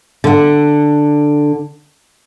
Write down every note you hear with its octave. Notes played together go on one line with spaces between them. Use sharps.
D3 F#5